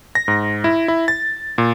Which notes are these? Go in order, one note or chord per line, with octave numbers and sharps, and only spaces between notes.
A#6
G#2
E4
E4
A6
A#2